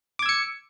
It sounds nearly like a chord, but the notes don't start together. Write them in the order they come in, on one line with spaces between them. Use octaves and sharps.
D6 G#6 E6 C#7